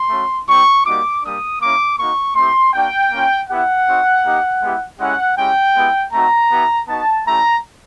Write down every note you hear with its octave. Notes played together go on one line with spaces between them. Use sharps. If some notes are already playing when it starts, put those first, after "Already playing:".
Already playing: C6
A3 C#4 F#4
G3 C4 E4 G4 C#6
G3 A#3 D#4 F#4 D6
G3 A#3 D4 D#6
A#3 C#4 E4 D6
A#3 D#4 F#4 C#6
A3 C4 E4 G4 C6
A#3 D4 F#4 G5
A#3 C#4 F4
B3 E4 G4 F#5
C4 D#4 F#4
A#3 D#4 G4
G#3 B3 E4 G4
G#3 C#4 E4 G4 F#5
G#3 C#4 E4 G4 G5
G#3 B3 E4 G4
A3 C4 D#4 F#4 A#5
B3 E4 G4
B3 D#4 F#4 A5
A3 C#4 E4 G4 A#5